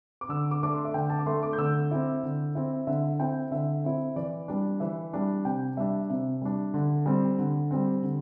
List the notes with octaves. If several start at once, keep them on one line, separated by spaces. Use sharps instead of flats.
D6
D3 E6
D6
A3 D4 D6
C6
E5
D3 G5
A5
D6
A3 D4 C6
D6
G6
D3 E6
C4 E4
D3
C4 E4
D3 E5
C4 E4 G5
D3 E5
C4 E4
E3 D5
G3 D4
E3 E5
G3 D4
C3 G5
G3 D4 E5
C3 E5
G3 D4
D3
G3 C4
D3
G3 C4
D3